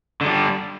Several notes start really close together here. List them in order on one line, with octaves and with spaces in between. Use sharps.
D3 G#3 G3